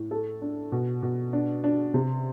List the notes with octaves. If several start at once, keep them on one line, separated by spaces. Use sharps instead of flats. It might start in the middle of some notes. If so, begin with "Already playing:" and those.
Already playing: A2
A4
D4
B2
B2
D4
D4
C3